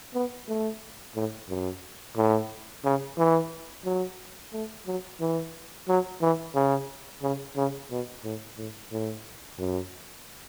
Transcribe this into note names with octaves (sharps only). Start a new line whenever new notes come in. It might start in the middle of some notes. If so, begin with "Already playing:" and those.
B3
A3
A2
F#2
A2
C#3
E3
F#3
A3
F#3
E3
F#3
E3
C#3
C#3
C#3
B2
A2
A2
A2
F#2